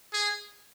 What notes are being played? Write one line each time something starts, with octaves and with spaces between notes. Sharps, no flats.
G#4